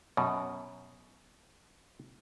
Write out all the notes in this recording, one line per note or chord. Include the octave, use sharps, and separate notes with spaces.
F#2 B2